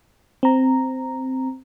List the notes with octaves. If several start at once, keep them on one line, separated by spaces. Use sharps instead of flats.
C4 A#5